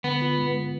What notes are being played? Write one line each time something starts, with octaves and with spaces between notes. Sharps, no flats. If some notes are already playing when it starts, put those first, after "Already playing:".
D3 B3
F4
G#3
B3